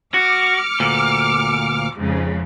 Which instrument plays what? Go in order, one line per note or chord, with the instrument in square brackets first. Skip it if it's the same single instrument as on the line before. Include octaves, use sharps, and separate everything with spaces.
[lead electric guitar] F#4 [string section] D6 F6 C#7
[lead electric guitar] D2 A#2
[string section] F2 G#2 C#3